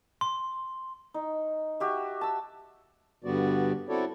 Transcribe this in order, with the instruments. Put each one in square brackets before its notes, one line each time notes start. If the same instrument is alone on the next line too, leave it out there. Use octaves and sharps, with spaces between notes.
[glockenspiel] C6
[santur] D#4
F#4 G4 E5
A5 E6
[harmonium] G2 D3 G3 B3 F#4 D5
C4 E4 F#4 A4 C#5 D5